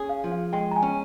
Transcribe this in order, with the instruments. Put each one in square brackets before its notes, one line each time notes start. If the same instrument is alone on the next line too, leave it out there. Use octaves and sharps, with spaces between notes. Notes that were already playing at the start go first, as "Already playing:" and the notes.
Already playing: [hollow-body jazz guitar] C#4 G#4
[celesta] F5
[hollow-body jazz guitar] F3
[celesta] F5
[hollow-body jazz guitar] G#3 [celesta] G5
[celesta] A#5
G#5
[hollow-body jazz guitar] C#4